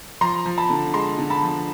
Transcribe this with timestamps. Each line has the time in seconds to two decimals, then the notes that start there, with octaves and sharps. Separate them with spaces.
0.21 F3 A#5 C6
0.45 F3
0.58 A5 B5
0.70 D3
0.94 G#3 A#5 C6
1.18 D3
1.30 A5 B5
1.42 F3